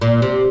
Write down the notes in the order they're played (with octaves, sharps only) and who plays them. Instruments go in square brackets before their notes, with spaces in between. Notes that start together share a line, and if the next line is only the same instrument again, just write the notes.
[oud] A#2
C3